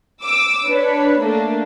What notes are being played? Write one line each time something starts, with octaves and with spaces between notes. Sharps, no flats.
D6 E6
D4 B4 C#5
A3 A#3 D4